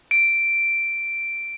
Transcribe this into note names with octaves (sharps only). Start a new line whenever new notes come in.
D7